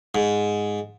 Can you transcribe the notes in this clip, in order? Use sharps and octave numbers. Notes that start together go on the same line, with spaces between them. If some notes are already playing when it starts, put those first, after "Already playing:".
G#2